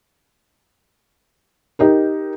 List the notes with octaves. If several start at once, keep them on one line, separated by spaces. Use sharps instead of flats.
D#4 G4 A#4